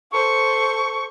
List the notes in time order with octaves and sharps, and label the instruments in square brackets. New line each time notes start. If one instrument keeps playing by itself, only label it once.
[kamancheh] A4 C5 [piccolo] C#6